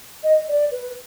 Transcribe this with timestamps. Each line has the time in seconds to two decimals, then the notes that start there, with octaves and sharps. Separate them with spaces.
0.23 D#5
0.48 D5
0.71 B4